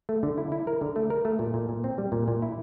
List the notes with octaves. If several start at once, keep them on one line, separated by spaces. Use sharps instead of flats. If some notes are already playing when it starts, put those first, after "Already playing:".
A3
D3
E4
E4
A#4
D3
A3
A#4
A3
A#2
A#2
A#2
C4
G3
A#2
A#2
E4